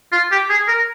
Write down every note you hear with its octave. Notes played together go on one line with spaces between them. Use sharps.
F4
G4
G#4
A#4